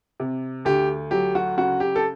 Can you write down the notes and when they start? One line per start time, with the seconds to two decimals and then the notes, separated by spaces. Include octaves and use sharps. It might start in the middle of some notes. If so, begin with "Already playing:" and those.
0.20 C3
0.65 D2 G4
1.11 F#3 G4
1.35 F#4
1.57 C#3 F#4
1.80 G4
1.96 A4